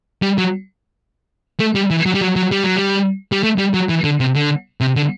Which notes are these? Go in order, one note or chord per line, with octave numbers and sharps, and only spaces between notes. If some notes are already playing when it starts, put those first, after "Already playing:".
G3
F#3
A3
G3
E3
F#3
G3
F#3
F#3
G3
F#3
G3
G3
A3
G3
F#3
E3
D3
C3
D3
C3
D3